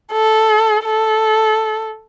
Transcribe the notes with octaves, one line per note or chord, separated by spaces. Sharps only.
A4
A4